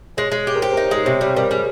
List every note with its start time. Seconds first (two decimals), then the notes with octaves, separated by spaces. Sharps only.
0.17 G#3 C#5
0.32 G#3
0.47 G4
0.55 A#4
0.62 G4 C5
0.73 A#4
0.77 D#4
0.84 C#5
0.91 G#3 C5
1.06 C3 C#5
1.21 G3 C5
1.37 G3 A#4
1.51 G3 G#4